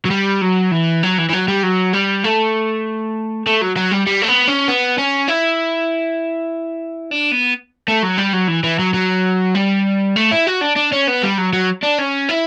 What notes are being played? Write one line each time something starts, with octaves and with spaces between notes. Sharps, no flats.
F#3
G3
F#3
E3
F#3
E3
E3
F#3
G3
F#3
G3
A3
A3
F#3
F#3
G3
G3
A3
B3
C#4
B3
C#4
E4
D4
B3
A3
F#3
G3
F#3
E3
E3
F#3
F#3
G3
A3
E4
F#4
D4
D4
C#4
B3
G3
F#3
F#3
D4
C#4
E4